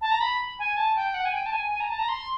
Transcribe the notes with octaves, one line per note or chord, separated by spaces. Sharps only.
A5
A#5
B5
G#5
A5
G5
F#5
G#5
G5
A5
G#5
G#5
A#5
A5
A#5
C6